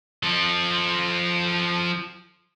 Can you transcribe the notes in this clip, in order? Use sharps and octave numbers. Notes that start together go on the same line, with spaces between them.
F3 A4